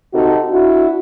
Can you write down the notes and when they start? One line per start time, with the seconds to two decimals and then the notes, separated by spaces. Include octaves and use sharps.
0.14 C3 D#4 F#4 A4
0.51 D4 E4 F#4